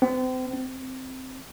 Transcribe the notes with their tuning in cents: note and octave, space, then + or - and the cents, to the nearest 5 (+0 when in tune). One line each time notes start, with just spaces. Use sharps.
C4 -35
C4 -5